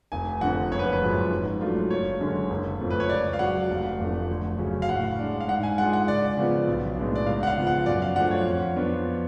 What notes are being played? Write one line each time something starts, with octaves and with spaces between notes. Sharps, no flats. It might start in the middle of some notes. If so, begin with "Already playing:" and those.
F1 G#5
F2 D3 F#5
F#1 C#5
B4
B4
F#2 F3 G#3
G#2
F#3 A3 D4 F4
F#1 C#5
F#2 D3 G#3 C#4
F#1
F2 F3 A3
B4
C#5
C#2 D5
F5
C#3 F#3 F#5
F1
F2 F3 A3 D4
D2
C#3 F#3 C#4
F5
A2 F#5
G#3 D4
F5
G#2 F#5
G#5
G#3 D4 F4 F#5
F#5
C#2 D5
C#3 F3 B3 F4
B1
A2 G#3 B3 D4
D5
C#2 F5
F#5
F5
C#3 F3 B3 F4
F#5
F#2 D5
F5
F3 A3 D4 F#5
C#5
F2
F3 B3 D4 F4